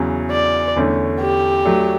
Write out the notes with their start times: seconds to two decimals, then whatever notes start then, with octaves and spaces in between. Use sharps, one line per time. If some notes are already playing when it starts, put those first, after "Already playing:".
Already playing: E2 C#3 F#3
0.31 D5
0.76 E2 D3 A3 C#4
1.21 G4
1.65 F#3 A3 D4